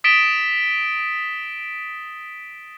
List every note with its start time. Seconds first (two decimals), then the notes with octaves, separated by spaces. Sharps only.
0.04 D#6 A6 B6 D7 E7 G7